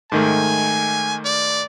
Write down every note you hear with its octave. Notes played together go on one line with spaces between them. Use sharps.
G#2 D#3 A3 G#5
D5